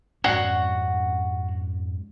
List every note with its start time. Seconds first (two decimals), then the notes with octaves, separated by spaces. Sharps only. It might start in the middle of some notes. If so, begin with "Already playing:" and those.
0.24 F2 G#2 C#4 F#4 D5 F#5